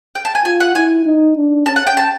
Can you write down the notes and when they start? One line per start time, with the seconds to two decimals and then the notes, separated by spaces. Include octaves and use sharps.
0.15 G5
0.25 A5
0.35 G#5
0.45 F4 G#5
0.60 F#5
0.75 E4 G#5
1.05 D#4
1.36 D4
1.66 C#4 A5
1.76 F#5
1.87 G5
1.97 A5